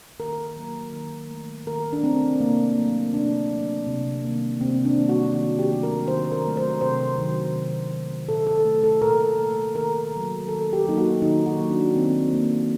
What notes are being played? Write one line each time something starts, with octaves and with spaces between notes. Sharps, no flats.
D#3 A#4
F#3 A#3
D#3
A3
D#3 A#4
D4
A3 C4
C3 A#3
F#3 A3
C3 D4
F#3 A3
C3
D#3 G3 A#3
C3 C4
D4
D#3 G3 A#3
F#4
D#3 F#4
G4
F#3 A3
A#4
D#3 C5
A#4
F#3 A3
C5
C3 C5
D#3 F#3 A3
C3
D#3 F#3 A3
A#2 A4
A4
A3
A4
A#2 A#4
A3
D#3 A#4
F#3 A#3
D#3 A4
G4
F#3 A#3 D#4
F#4
D#3 D#4
F#4
F#3 A#3
D4
D#3 C4
F#3 A#3